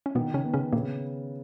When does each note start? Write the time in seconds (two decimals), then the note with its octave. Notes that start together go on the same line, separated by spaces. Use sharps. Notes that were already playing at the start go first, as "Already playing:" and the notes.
0.06 C#4
0.15 B2 D#3 B3
0.34 C#3 C#4
0.44 B3
0.54 C#3 C#4
0.73 A#2 C#3 A#3